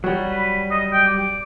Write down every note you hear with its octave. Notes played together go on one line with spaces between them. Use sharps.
F#3 G3
B4
D#5
G5
D5